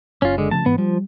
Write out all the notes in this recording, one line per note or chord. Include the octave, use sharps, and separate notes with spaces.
F#1 C#4 F4
D3 G#3
C#3 F3 A3 A5
G#2 E3 B3
F3 G3